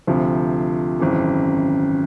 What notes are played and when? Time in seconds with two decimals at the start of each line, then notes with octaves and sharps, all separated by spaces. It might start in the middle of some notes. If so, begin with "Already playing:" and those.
0.07 D2 C3 F3
1.00 G#1 F#2 C#3 E3